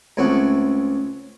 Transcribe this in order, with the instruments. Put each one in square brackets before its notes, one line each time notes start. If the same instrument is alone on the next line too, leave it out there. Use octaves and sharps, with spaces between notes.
[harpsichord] C#2 A3 C4 C#4 F#5